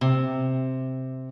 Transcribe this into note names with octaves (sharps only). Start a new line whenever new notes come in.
C3